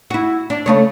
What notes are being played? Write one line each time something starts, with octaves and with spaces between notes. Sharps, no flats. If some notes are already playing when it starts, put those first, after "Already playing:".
E4 F#4
D4
C#3 A3 C#5